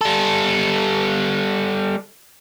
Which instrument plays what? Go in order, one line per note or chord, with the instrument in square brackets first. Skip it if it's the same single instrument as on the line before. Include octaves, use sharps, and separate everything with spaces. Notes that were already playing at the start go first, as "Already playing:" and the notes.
[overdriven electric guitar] G3 A4